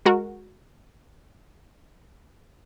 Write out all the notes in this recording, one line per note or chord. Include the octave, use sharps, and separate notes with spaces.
G#3 F#4 A#4